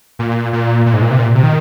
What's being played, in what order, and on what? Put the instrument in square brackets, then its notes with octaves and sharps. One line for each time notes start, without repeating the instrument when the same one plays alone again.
[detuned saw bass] A#2
A#2
A#2
G#2
A#2
C3
A#2
C3
D#3